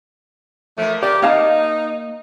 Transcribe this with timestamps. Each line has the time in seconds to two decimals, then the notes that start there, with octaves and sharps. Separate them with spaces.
0.78 F3 A3 A#3
1.03 G4 D5
1.22 A#3 D#4 D#5 F5 A5